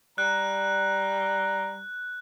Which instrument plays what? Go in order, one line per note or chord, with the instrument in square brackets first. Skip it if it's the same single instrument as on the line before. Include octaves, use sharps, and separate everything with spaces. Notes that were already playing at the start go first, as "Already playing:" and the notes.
[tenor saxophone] G3 [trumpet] A#5 [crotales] F#6